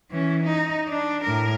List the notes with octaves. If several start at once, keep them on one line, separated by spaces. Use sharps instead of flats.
E3 C#4
D#4
D4
A2 A#4